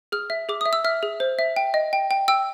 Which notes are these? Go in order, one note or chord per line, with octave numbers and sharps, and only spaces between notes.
G#4 F6
E5
G#4 D6
E5 D#6
E6
E5 F6
G#4
C5
E5
G5
D#5
G5
G5
G5 E6